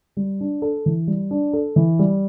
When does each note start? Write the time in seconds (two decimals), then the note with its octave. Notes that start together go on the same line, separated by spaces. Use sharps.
0.17 G3
0.41 D4
0.62 A4
0.86 E3
1.07 G3
1.31 D4
1.53 A4
1.76 E3
1.99 G3